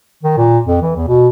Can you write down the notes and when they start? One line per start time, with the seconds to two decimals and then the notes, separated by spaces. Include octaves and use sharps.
0.23 D#3
0.37 A#2
0.66 F2
0.82 E3
0.96 E2
1.07 B2